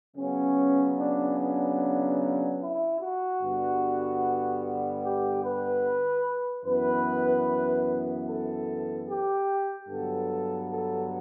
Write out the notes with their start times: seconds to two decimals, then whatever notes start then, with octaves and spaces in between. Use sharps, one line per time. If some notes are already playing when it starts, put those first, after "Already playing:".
0.16 C#3 F#3 B3 C#4
0.97 D4
1.38 D4
2.60 E4
3.00 F#4
3.41 G2 D3 G3 B3
5.02 G4
5.42 B4
6.65 F#2 E3 B3 B4
8.27 A4
9.07 G4
9.88 G2 D3 F#3 B3 A4
10.70 A4